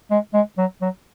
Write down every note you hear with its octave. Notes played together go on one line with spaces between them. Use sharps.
G#3
G#3
F#3
F#3